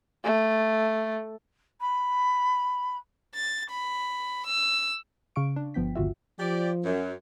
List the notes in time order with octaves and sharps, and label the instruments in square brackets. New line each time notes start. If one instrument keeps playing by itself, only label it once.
[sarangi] A3
[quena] B5
[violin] A6
B5
E6
[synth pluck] C#3 F5 C#6 D7
D4
G1 F3 B3 G5 B6
G1 D#2 F4 F#4 E5
[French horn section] F3 [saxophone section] G4 D5
[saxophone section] F#2